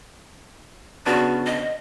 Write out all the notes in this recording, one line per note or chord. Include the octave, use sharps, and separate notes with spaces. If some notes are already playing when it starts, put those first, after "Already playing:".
C#3 B3 D4 F#4
D#5